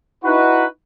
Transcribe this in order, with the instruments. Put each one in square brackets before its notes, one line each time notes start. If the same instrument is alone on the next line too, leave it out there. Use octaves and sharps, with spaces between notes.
[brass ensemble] D#4 E4 F#4 B4